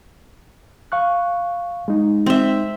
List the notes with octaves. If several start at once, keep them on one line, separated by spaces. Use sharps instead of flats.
F5 C#6 F#6
G#3 D#4
C4 E5